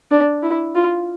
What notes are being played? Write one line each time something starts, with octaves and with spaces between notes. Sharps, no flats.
D4
E4
F4